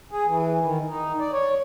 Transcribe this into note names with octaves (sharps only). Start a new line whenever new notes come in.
G#4
E3
D#3
D#4
D5
C#5